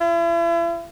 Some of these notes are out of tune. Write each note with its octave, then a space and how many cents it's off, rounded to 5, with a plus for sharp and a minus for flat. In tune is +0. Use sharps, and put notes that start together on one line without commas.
E4 +40